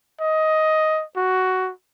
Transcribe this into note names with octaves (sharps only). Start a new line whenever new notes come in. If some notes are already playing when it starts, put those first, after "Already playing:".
D#5
F#4